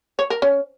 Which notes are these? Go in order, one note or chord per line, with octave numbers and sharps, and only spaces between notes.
C#5
A#4
C#4